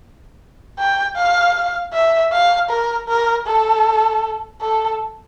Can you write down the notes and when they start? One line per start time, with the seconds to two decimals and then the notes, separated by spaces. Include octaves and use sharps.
0.79 G5
1.17 F5
1.93 E5
2.32 F5
2.70 A#4
3.08 A#4
3.46 A4
4.61 A4